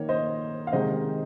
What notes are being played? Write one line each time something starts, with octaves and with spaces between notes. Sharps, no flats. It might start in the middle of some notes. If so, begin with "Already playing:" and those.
Already playing: D#3 A#3 D#4 C#5
C5 D#5
F5
C3 D#3 G#3 D#4 C5 D#5